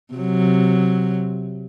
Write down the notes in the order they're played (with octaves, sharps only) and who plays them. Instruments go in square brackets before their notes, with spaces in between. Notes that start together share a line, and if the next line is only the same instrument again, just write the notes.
[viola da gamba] C3 F#3